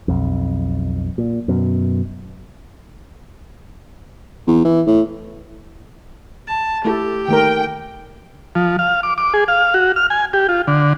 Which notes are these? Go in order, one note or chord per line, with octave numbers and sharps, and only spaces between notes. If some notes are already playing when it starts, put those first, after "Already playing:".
B1 F2
A#2
F#2 B2
E2
E3
A2
A5
A3 E4 G4 A4
D#3 A3 A#4 G5
F3
F5
D6
D6
G#4
F5
F#4
F6
G#5
G4
F4
D3